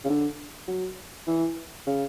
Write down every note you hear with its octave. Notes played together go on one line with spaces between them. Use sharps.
C#3
D3
F#3
E3
C#3